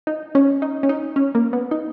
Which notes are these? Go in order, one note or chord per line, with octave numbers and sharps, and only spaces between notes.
D#4
C#4
D#4
C#4
D#4
C#4
A#3
B3
D#4